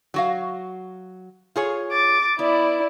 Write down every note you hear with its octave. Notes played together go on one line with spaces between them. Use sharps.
F#3 F#4 F5
F4 G#4 C#5
D6 A6
B3 E4 D5